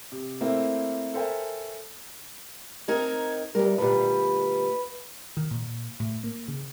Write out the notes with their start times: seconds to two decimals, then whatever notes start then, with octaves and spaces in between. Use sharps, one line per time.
0.12 C3
0.41 A3 A#3 C4 E4
1.14 A4 A#4 C5 E5 G5 G#5
2.88 C4 D#4 A#4 G#6
3.55 F#2 G3 B3 A#4
3.78 D2 A#2 G3 B4
5.37 D#3
5.51 A#2
6.00 A2
6.24 A#3
6.48 C#3